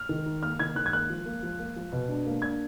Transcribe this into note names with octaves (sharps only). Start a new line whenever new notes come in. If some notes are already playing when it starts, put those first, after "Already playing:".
Already playing: F6
D#3
D#4
A#3 F6
D#3 G#6
D#3 F#6
G#6
A#3 F#6
F3
A#3
F3
A#3
F3
B2
D4
A#3
D4 G#6